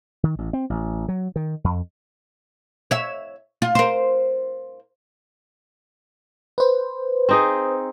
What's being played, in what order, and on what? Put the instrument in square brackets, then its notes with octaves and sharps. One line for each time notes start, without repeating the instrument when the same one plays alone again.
[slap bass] D#3
A1
C4
A1
F#3
D#3
F2
[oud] C#5 E5
F4
A#4 C5
[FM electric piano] B4 C5
[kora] C4 D#4 G#4